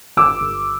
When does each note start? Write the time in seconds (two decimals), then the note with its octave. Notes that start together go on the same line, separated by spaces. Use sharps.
0.17 G1 D6 E6
0.41 G1